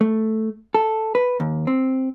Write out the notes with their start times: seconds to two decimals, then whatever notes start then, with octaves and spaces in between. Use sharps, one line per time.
0.01 A3
0.75 A4
1.15 B4
1.40 D#2
1.67 C4